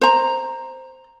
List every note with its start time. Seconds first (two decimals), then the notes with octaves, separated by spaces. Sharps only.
0.01 C5 A#5